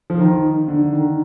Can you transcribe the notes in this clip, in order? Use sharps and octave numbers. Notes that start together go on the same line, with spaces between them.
F3
D#3
D3
D#3